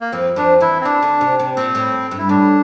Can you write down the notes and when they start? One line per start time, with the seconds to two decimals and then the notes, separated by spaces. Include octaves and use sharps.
0.01 A#3
0.12 F2 F3 C4
0.36 F2 F3 D4
0.60 E2 E3 E4
0.81 C4
0.84 E2 E3 D4
1.02 D2 D3
1.21 C3
1.40 C3
1.56 A#2 C4
1.75 A2
2.11 G2
2.18 E4
2.29 A2 D4